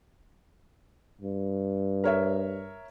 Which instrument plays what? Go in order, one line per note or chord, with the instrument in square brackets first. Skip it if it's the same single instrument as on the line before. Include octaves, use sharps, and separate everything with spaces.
[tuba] G2
[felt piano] A#4 C#5 E5